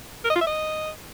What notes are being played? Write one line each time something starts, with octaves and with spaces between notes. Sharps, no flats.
A#4
D#5
F4
E5
D#5